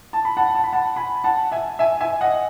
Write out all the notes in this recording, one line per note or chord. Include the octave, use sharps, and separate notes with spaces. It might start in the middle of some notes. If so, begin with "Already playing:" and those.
A5
B5
F#5 A5
A5
B5
F#5 A5
G#5 B5
F#5 A5
E5 G#5
E5 G#5
E5 G#5
D#5 F#5